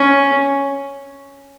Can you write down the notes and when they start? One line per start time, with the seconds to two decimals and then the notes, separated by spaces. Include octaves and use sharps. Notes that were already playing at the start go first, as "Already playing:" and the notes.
Already playing: C#4